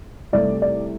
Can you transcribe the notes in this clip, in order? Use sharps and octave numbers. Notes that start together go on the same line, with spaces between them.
C2 C3 A3 D5
D5